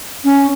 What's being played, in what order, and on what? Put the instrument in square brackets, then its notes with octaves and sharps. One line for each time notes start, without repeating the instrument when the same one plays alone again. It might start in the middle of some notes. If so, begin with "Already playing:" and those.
[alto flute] C#4